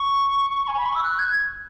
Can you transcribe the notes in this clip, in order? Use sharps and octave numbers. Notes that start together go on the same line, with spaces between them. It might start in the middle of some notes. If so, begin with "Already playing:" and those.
Already playing: C#6
G#5
B5
C#6
E6
F#6
G#6